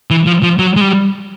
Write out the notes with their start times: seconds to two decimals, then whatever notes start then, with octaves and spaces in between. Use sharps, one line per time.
0.11 E3
0.27 F3
0.43 F3
0.59 F#3
0.76 G#3
0.81 G3